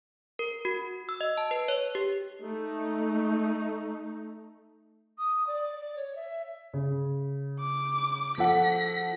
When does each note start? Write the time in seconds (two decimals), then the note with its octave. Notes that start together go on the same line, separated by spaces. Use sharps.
0.39 A#4
0.65 F#4
1.09 E6
1.21 D#5
1.37 A5
1.51 B4
1.68 C#5
1.95 G4
2.42 A3 D#4
5.18 D#6
5.47 D5
5.75 D5
5.96 C#5
6.15 E5
6.74 C#3
7.60 D6
8.38 F3 A4 F#5 B6